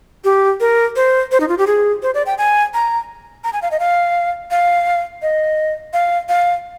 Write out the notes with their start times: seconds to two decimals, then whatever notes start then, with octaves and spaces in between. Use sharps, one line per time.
0.24 G4
0.60 A#4
0.96 C5
1.32 C5
1.40 D#4
1.49 F4
1.58 G4
1.67 G#4
2.03 C5
2.14 D5
2.26 G5
2.38 G#5
2.74 A#5
3.44 A#5
3.53 G#5
3.62 F5
3.71 D#5
3.80 F5
4.51 F5
5.22 D#5
5.93 F5
6.29 F5